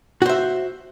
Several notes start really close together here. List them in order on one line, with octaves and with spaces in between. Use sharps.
F#4 C5 E5